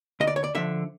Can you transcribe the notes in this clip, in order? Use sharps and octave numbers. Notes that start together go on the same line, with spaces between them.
D2 D#5
D5
C#5
D5
D3 F3 E5